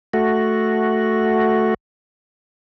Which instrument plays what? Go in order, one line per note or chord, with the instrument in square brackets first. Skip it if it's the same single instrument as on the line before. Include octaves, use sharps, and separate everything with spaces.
[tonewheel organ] A3 F#4